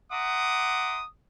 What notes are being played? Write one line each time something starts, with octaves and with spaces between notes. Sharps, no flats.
E5 F#5 A#5 C6 D6 D#6